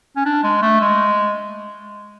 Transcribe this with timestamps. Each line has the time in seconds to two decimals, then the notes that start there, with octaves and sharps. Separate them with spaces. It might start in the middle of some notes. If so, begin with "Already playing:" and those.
0.16 C#4
0.26 D4
0.43 G#3
0.62 A3
0.81 G#3